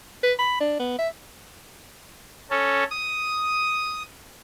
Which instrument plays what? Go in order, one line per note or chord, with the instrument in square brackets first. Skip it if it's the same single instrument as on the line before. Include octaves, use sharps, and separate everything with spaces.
[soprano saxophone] B4
B5
D4
B3
E5
[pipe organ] C#4 A4
D#6